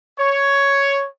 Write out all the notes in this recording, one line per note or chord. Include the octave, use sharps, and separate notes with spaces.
C#5